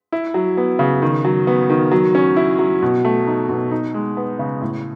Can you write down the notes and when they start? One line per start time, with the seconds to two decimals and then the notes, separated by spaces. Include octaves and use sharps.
0.12 E4
0.34 F#3
0.57 B3
0.79 C#3
1.02 D#3
1.25 F#3
1.47 B3
1.70 D#3
1.92 F#3
2.15 C#4
2.36 E4
2.59 F#3
2.82 B2
3.05 A3
3.27 D#4
3.49 B2
3.71 D#4
3.94 G#3
4.17 B3
4.39 C#3
4.61 A2